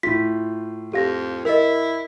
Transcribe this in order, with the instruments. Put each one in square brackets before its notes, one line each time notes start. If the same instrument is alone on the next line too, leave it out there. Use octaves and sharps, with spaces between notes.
[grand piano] A2 F4 [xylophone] B6
[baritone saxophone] F2 [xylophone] G4 F5 A#6
[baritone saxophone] E4 [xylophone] A#4 D#5